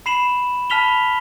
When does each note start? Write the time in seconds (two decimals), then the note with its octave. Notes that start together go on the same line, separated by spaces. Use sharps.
0.06 B5 C7 E7 F#7
0.70 A5 B5 F6 B6 F7 G7